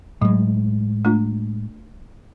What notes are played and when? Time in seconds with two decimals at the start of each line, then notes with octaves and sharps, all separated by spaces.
0.22 A2 F#3 G#3
1.05 A3 D4 F4